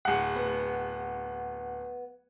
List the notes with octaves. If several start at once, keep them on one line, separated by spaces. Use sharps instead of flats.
D1 F#5
B3